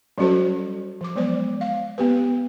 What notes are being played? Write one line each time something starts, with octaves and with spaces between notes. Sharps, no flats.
F#3 G3 C#4 F#4 A4 C5
F3 D6
F#3 G#3 B3 C5 D5
F5
B3 G4 B4